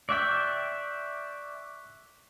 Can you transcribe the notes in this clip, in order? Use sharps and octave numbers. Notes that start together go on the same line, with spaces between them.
D5 E5 G5 C#6 F#6 B6